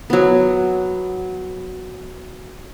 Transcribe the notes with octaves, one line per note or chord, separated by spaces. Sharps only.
F#3 B3